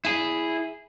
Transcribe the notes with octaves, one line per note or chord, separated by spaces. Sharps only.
E4 G#4